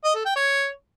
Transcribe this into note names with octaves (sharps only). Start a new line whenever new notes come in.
D#5
A4
G5
C#5